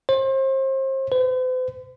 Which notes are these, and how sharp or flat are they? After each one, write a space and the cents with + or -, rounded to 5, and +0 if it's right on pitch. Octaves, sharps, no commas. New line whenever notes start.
C5 +35
C5 -45